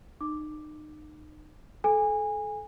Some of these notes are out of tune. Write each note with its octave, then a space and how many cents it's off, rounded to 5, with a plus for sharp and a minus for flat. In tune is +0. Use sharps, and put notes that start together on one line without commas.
D#4 -35 D6 +0
A4 -30 G#5 -20